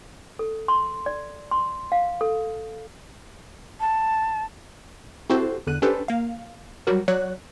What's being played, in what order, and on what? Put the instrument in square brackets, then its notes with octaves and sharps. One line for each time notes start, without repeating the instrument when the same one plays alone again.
[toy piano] A4
C6
D5
C6
F5
A4
[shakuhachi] A5
[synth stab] C4 E4 F#4 G4 A4 C5
E2 D3 F#6 D#7
C#4 D4 G4 A4 B4 C5
A#3 F5
F#3 G3 F#4 A#4
F#3 F#4 C#5 D5 F#6